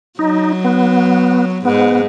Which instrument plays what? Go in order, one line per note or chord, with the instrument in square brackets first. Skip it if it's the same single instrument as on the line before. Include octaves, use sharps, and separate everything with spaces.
[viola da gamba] F#3 [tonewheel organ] D#4
[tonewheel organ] B3
[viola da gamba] G#2 [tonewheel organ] B3